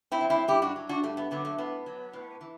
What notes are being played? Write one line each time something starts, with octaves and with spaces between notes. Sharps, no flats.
C4 E4
F#3
C4 E4
G2 E4 G4
D4 F#4
F#3
D4 F#4
G2 A3
B3
D3 F#3 B3
A3
A2 B3
F#3
A2
E3